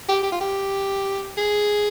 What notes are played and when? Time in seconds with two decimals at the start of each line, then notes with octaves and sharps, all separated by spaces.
0.09 G4
0.23 G4
0.32 F4
0.41 G4
1.37 G#4